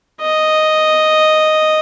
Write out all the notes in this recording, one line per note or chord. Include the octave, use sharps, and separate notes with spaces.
D#5